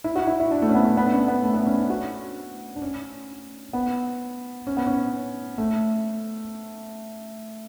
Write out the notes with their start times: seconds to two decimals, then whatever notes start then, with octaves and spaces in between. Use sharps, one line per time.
0.04 E4
0.16 F#4
0.27 E4
0.40 E4
0.51 D4
0.62 A3
0.69 C#4
0.74 B3
0.85 A3
0.97 B3
1.06 D4
1.13 C#4
1.28 B3
1.43 A3
1.54 B3
1.66 C#4
1.78 D4
1.90 F#4
2.76 D4
2.82 C#4
3.73 B3
4.67 C#4
4.77 B3
4.87 C#4
5.58 A3